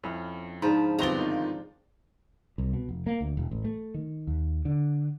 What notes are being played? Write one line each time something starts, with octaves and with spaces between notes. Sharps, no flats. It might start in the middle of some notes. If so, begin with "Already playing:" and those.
F2 C#4 E4 F#5
G#2 C#3 F3 D4 B5
G1 G3 B3 C4 F4 D5 A#5 G7
D#3 D#4 F4
C2
B2
F1
A#3
D2
E1
A1
A3
D#3
D#2
D3